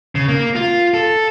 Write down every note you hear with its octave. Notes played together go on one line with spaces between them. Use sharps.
C#3
A#3
F4
A4